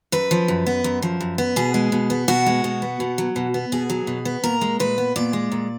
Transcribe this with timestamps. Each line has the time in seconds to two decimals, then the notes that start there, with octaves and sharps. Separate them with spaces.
0.12 F#2 B4
0.31 F3
0.48 F#2
0.66 B3
0.84 F#2
1.02 F3
1.21 F#2
1.38 B3
1.56 B2 G#4
1.74 G#3
1.92 B2
2.10 B3
2.28 B2 F#4
2.46 G#3
2.64 B2
2.82 B3
3.00 B2
3.18 F#3
3.36 B2
3.54 B3
3.72 B2 G#4
3.90 F#3
4.07 B2
4.25 B3
4.44 A#2 A#4
4.61 G#3
4.80 A#2 B4
4.98 B3
5.16 A#2 D5
5.33 G#3
5.52 A#2